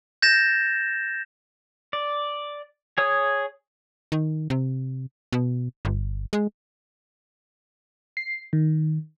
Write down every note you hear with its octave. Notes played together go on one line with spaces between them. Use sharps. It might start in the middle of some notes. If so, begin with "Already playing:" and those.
G6 A6 A#6 E7
D5
G#4 C#5 D#6
D#3
C3
B2
G1
G#3
C7
D#3